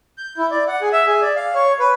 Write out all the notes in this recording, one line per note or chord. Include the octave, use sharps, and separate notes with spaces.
G6
E4
D5
F#5
G#4
E5
G#4
D5
F5
C#5
B4